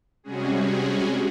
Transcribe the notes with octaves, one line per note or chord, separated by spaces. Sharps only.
C3 G3 G#3 C#4 F#4 G#4